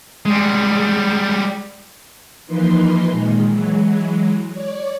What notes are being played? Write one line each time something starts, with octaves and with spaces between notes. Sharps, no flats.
G3 G#3
E3 F3 A#3 D#4 B4 C6
A#2 D#3 G#3
E3 F#3 G#3
C#5 D5